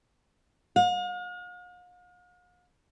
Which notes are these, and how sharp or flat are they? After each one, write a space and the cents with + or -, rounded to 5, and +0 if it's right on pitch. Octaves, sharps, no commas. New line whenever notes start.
F5 +45